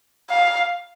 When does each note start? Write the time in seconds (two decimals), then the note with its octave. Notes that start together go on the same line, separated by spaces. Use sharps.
0.30 F5